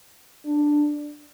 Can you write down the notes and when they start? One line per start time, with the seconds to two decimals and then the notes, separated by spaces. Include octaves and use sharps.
0.46 D4